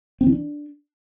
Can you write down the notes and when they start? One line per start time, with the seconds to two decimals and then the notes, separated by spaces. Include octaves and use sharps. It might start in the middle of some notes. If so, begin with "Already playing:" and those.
0.21 C4
0.26 E3
0.32 D4